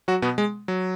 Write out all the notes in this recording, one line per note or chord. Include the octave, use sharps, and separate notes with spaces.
F#3 F#4
B2 B3
G#3
F#3